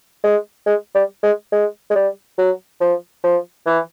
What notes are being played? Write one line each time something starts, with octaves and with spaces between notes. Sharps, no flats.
G#3
G#3
G3
G#3
G#3
G#3
G3
F#3
F3
F3
E3